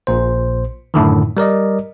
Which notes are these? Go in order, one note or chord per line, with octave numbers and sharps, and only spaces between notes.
A#1 A#2 C5
F#2 A2 D3 D#3
G3 A#4 D5 D#5